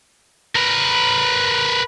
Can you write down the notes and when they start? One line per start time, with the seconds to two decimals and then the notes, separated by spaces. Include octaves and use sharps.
0.55 A#4 B4